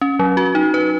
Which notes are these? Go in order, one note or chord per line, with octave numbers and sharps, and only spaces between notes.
C#4
F#3
F#4
D#4
B4